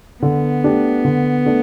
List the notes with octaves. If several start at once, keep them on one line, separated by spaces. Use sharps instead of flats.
D3 B3
A3 D4 G4
D3
A3 D4